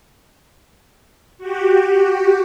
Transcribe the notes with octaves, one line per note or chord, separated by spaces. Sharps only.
F#4 G4